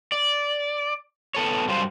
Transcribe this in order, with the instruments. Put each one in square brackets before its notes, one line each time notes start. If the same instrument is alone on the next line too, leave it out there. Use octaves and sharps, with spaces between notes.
[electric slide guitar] D5
B3 A4 C#5
G2 F#3 G3 F4 C5